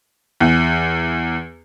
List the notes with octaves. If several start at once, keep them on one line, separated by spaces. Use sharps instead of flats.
E2